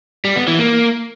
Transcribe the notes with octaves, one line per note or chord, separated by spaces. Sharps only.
G3
B3
E3
A#3